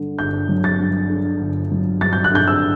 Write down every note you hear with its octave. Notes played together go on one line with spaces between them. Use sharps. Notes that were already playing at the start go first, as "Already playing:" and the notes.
Already playing: G2 D3
G1 G6
F#3
A6
G2
D3
G1
F#3
G2 A6
G6
F#6
D3 G6
E6